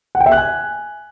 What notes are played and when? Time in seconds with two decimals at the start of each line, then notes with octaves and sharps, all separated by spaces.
0.15 F#5
0.20 G5
0.26 E5
0.32 F#6
0.37 G#5